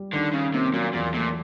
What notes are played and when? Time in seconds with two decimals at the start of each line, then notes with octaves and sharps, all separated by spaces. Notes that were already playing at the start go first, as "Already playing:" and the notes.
Already playing: G3
0.13 D3 D#3
0.33 C#3 C#4
0.53 C3 A#3
0.73 A#2 F#3
0.93 E2 A#2
1.13 A#2 A3